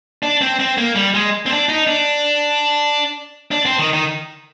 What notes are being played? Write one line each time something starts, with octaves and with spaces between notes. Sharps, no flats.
D4
C4
C4
A#3
G3
G#3
C4
D4
D#4
D4
D4
C4
D#3
D#3